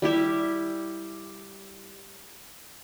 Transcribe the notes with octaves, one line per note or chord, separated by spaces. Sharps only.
G3 E4 G4 E5